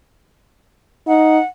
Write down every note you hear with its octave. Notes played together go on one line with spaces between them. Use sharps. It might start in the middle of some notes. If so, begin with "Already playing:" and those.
D#4 F#5